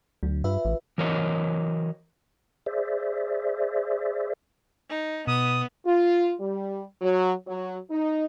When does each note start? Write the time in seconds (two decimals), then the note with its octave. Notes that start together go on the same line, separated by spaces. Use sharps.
0.23 D2 F#3
0.44 G2 F4 B4 E5
0.65 A1
0.98 E3 F#3 A#4 C5 C#5 D#5
2.66 G#4 C5 D5 E5
4.90 D#4
5.27 B2 B3 D#6
5.86 F4
6.40 G3
7.02 F#3
7.47 F#3
7.91 D#4